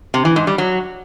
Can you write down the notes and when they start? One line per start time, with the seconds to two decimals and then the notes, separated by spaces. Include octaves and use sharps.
0.14 C3
0.25 E3
0.36 G#2
0.47 G3
0.58 F#3